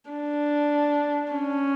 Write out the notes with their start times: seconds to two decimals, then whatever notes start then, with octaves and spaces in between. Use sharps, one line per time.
0.10 D4
1.32 C#4